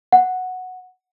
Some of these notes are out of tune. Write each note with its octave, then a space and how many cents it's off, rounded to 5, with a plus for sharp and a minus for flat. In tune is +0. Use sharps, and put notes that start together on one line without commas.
F#5 -5